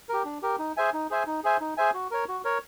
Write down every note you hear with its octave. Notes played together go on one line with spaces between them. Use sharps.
G4 A#4
D4
G4 A#4
D#4
G#4 C5 E5 G#5
D#4
G#4 C5 E5 G#5
D#4
G#4 C5 E5 G#5
D#4
G#4 C5 E5 G#5
F#4
A#4 C#5
F#4
A#4 C#5